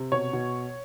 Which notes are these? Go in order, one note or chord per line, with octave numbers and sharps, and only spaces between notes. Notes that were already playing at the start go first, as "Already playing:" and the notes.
Already playing: C3
B2 C#5
B2